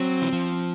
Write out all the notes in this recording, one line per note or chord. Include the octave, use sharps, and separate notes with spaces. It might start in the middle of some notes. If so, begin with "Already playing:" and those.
Already playing: F#3 C4
E3
F3